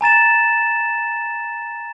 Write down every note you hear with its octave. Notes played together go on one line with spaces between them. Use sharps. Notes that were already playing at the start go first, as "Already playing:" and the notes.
G#5 A#5 A6 E7